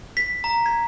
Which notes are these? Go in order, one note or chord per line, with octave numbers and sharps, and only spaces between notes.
B6
A#5
G#6